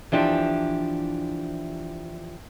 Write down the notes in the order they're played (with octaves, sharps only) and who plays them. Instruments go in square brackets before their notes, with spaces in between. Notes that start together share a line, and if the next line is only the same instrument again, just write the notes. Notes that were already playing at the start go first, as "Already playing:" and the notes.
[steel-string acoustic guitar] E3 F3 D4 G4